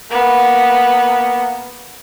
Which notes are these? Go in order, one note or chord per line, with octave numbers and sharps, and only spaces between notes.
A#3 B3